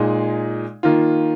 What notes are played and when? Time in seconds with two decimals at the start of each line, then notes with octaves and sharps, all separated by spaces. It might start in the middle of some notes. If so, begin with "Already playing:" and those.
Already playing: A#2 G#3 D#4 G#4
0.83 D#3 A#3 F4